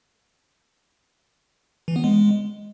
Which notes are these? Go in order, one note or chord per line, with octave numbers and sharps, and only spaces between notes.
E3
B3
G#3